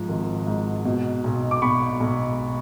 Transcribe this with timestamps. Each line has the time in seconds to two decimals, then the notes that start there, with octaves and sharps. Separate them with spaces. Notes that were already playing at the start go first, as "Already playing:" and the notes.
Already playing: G#2 F3
0.09 G#1
0.47 G#2
0.85 B2
1.24 B1
1.51 D6
1.62 B1 B5 C#6
2.00 B1